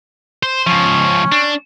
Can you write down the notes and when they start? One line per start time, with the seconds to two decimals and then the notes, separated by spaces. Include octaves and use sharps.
0.43 C5
0.67 C#2 F3 C#4
1.32 D4